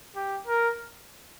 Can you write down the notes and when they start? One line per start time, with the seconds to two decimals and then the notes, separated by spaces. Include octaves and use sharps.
0.16 G4
0.47 A#4